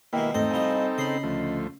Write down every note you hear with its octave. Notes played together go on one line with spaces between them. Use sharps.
D#2 B2 G#3 A#3 E4 D#5 G5
E2 G#2 A3 C4 D#4 A4 D#5
C2 F3 D#5 G#5 B5
C#3 C#4 D#5 B5 C7
D2 F3 A3